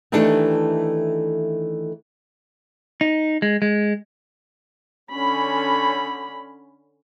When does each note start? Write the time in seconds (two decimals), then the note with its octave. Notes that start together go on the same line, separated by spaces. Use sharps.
0.12 D#3 E3 A3 D4 G4 A4
3.01 D#4
3.42 G#3
3.62 G#3
5.13 D3 C#4 B5